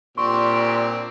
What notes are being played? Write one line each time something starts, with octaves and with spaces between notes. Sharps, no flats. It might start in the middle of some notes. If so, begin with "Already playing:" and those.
A#2 C4 D4 G4 C6 C#6